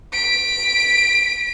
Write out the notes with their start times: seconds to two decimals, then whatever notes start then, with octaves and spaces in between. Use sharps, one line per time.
0.12 B6 D7